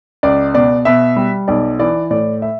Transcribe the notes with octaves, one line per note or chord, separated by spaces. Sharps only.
C#2 D5
B2 D5
B2 E5
G3
B1 D5
E3 D5
A2 D5
E5